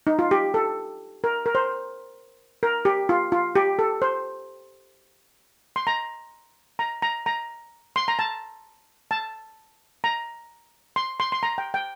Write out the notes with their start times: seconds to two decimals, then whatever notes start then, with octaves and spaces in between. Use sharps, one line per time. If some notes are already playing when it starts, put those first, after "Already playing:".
0.07 D#4
0.19 F4
0.31 G4
0.54 A4
1.24 A#4
1.46 A#4
1.55 C5
2.63 A#4
2.85 G4
3.09 F4
3.32 F4
3.56 G4
3.79 A4
4.02 C5
5.76 C6
5.87 A#5
6.79 A#5
7.02 A#5
7.26 A#5
7.96 C6
8.08 A#5
8.19 A5
9.11 A5
10.04 A#5
10.96 C6
11.20 C6
11.32 C6
11.43 A#5
11.58 G5
11.74 G5